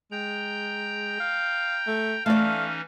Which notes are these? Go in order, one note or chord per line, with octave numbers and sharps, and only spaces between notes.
G#3 G5 A#5 G6
F5
A3
E3 A3 C#4 D#4 D5 F5